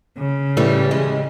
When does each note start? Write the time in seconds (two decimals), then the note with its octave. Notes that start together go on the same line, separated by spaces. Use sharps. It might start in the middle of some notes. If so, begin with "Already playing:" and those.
0.18 C#3
0.57 A2 E3 G3
0.91 G#3